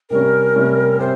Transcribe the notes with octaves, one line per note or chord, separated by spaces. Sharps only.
C3 G3 C#4 A#4
C3 G3 C#4
C3 C5